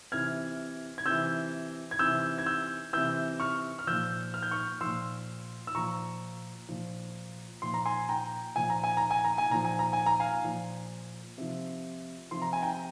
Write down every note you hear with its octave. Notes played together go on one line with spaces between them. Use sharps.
C3 E3 F6 G#6
G#6
C3 E3 E6 G6
G#6
C3 E3 E6 G6
G#6
E6 G6
C3 E3 E6 G6
C#6 F6
F6
A#2 F3 E6 G6
F6
G6
C#6 F6
A#2 F3 C6 E6
E6
A#2 F3 A#5 C#6
A#2 F3
A#2 F3 C6
A#5
G#5 C6
G5 A#5
A#2 F3 G#5
A#5
G#5
A#5
G#5
A#5
G#5
A#2 F3 A#5
G#5
A#5
G#5
A#5
F5 G#5
A#2 F3
C3 F3
C3 F3 C6
A#5
G#5
G5 A#5